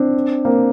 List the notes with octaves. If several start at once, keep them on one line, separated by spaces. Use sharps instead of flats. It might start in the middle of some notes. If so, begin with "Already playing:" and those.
Already playing: C4 D4
A#3 C4